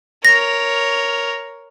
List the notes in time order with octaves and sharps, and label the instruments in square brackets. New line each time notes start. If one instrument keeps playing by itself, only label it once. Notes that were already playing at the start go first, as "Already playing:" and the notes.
[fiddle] A#4 C#5 [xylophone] A#6